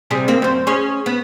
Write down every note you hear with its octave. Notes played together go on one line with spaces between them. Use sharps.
C3 G3 G#4
D2 A#3 C4
F#2 C5
C#4 G#4 C#5
B3